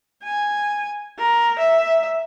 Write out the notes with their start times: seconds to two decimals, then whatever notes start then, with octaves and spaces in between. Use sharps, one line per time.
0.24 G#5
1.18 A#4
1.59 E5